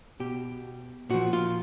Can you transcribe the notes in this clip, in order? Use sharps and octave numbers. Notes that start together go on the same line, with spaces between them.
B2 G4
A#2 F3 F#4
F4